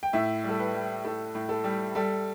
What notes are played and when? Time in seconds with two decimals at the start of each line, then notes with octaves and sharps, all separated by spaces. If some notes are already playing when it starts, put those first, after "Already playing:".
0.03 G5
0.13 A2 E5
0.44 G3 A4
0.59 B4
0.74 G3
1.05 A2 A4
1.35 A2
1.49 A4
1.64 G3
1.95 G3 A4